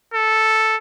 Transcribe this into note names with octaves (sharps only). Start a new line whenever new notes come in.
A4